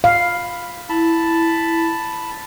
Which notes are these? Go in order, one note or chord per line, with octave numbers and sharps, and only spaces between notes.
F5 B5
E4 A5 B5